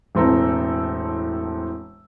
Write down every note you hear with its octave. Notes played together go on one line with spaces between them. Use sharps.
E1 A2 C4 A4 A#5